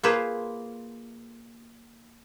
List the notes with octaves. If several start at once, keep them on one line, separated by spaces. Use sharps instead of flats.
A#3 F4 G#4 B4 C5